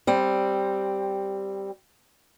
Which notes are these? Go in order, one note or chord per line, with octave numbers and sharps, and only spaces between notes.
G3 C4